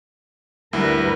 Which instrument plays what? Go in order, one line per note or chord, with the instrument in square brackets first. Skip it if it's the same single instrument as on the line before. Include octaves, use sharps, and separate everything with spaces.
[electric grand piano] D2 E4 [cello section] G3 A#4 B4